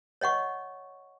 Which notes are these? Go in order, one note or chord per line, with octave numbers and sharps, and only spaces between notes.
C#5 D#5 F#5 C#6